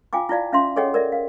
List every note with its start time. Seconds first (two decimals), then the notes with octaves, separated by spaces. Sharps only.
0.13 F4 F5 G5 G#5 D6
0.29 E4 F4 D5 F5
0.53 C#4 E5 F5 C6
0.76 G#4 A4 C#5 D#5 F#5 G5
0.94 A#4 D5 E5
1.12 F5